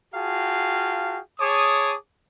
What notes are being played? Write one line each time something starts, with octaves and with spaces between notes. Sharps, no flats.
F4 F#4 G#4 F5 G5 A5
G#4 C#5 A5 D6 D#6